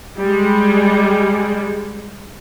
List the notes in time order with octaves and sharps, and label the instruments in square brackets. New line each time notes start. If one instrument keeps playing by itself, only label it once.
[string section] G3 G#3